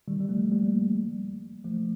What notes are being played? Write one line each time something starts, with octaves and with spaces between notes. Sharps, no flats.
D#3 G3
G3
F3 A3
G3 A#3
F3 A3